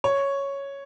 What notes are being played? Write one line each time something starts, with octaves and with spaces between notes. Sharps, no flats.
C#5